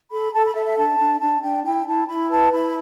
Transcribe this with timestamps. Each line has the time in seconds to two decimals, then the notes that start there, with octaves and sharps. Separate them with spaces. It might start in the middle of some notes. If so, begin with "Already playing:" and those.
0.11 A4 B5
0.33 A4 A5
0.44 B5
0.55 A4 E5
0.66 E5
0.76 D4 A5
0.98 D4
1.20 D4 A5
1.42 D4 G5
1.64 E4 G5
1.86 E4 A5
2.07 E4 B5
2.29 B4 A5
2.51 E4 B5